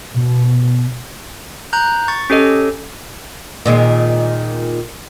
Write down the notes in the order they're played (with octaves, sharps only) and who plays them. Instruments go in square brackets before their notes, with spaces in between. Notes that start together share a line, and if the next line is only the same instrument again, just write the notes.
[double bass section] B2
[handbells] A#5 F#6 G6
C#6 A6
C#4 G4 A4 D#5
[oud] A#2 D#3 G#3